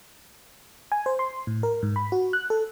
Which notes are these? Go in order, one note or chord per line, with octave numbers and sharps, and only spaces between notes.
G#5
C5
C6
A2
A#4
G#2
B5
F#4
F#6
A4